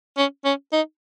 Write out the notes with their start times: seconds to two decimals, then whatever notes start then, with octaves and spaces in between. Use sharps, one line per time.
0.18 C#4
0.45 C#4
0.73 D#4